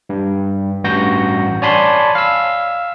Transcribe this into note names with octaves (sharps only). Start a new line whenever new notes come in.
G2
A1 G2 F#4 G6 A#6
C#5 D5 G#5 A5 B5 C6
F5 E6